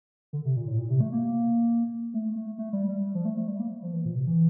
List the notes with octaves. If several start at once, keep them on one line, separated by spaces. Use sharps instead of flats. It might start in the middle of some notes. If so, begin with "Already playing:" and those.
D3
C3
A#2
A2
A#2
C3
A3
A#3
A3
A3
A3
G3
G3
F3
A3
A3
G3
A#3
F3
E3
A#2
C3
E3